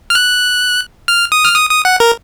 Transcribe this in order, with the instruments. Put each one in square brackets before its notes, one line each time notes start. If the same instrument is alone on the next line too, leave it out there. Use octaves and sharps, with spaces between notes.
[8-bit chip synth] F6
F#6
F6
D#6
F6
D#6
D#6
F#5
A#4